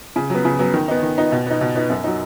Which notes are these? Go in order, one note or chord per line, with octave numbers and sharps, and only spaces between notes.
C#3
F#3 B3
C#3
F#3 B3
D#3
B3 D#4
D#3
B3 D#4
B2
B3 D#4
B2
B3 D#4
F#2
F#3 D#4